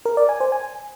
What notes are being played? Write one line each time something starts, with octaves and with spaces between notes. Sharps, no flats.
A#4
D5
G#5
C5
G#5